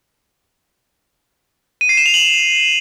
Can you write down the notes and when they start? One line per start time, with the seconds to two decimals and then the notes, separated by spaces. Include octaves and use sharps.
1.81 D#7
1.89 C7
1.97 E7
2.06 F7
2.14 F#7